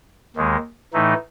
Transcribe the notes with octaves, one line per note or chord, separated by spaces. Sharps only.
D#2 D#3 G#3
A2 E3 A3 D#4